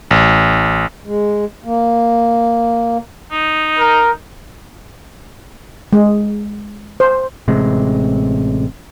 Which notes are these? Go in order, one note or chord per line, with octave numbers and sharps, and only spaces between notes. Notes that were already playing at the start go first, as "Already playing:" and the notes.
A1
G#3
A#3
D#4
A#4
G#3
C5
A1 C3 G#3